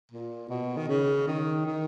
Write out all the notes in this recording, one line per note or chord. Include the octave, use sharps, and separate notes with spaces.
A#2
B2
D#3
C#3
D#3
D#3